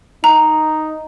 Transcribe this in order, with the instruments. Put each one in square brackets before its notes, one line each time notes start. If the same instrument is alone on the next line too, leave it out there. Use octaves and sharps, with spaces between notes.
[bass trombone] D#4 [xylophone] A#5